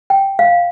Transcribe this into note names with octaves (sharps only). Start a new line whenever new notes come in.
G5
F5